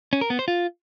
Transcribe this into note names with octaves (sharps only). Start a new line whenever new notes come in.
C#4
A#4
B3
C5
F4